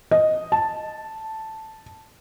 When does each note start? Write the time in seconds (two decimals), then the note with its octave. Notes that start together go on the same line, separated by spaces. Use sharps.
0.11 D#5
0.52 A5